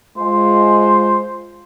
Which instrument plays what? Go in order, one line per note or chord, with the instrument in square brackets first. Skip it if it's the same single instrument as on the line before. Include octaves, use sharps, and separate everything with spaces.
[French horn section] G#3 F4 [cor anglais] C5